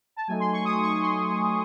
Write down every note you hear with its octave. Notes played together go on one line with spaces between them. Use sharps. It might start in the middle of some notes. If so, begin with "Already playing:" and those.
A5
F#3 A3 D#4 G#5
C6
C#6
D#6
C#6
C6